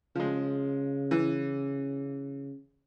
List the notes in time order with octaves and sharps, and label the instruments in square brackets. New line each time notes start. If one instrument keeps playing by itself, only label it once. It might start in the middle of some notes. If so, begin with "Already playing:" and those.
[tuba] C#3 [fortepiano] F3 G#3
[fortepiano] E3